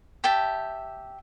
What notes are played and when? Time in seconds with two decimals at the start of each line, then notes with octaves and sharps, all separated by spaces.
0.24 G4 E5 G5 A5